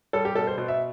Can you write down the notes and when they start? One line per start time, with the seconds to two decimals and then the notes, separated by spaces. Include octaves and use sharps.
0.13 G3 A4
0.25 G4
0.35 B2 A4
0.47 C5
0.58 B2 C5
0.68 E5